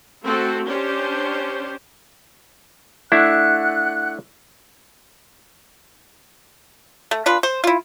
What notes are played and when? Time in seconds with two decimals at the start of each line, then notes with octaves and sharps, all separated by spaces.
0.23 A3 C4 F#4 A4
0.66 C#4 D4 G4 C5
3.12 A3 D4 E4 F#5 F#6
7.11 A3
7.26 D4 F4 B4
7.43 C5
7.64 E4 F4